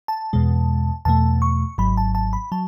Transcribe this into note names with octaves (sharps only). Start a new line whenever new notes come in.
A5
E2 B2 G#3
E2 B2 A3 A5
C#6
G#1 G#2 F#3 B5
A5
A5
B5
F#3 A5